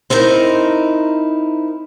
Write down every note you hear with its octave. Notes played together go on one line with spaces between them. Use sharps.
C4 D#4 E4 A#4